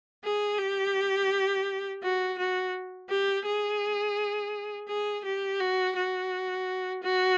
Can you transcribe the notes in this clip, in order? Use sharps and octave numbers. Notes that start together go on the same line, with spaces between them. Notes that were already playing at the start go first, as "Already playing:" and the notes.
G#4
G4
F#4
F#4
G4
G#4
G#4
G4
F#4
F#4
F#4